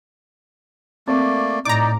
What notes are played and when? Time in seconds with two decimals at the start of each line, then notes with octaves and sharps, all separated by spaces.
1.08 A3 A#3 C4 D5
1.65 A2 D#4 D5 A#5 D6